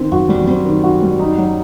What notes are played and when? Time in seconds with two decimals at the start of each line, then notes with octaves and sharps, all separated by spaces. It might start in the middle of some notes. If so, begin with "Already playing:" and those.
Already playing: D#3 C4
0.12 F#2 F#4
0.29 E2 G3
0.47 F#2 C4
0.65 D#3
0.84 F#4
1.02 G3
1.19 D#4
1.38 F#3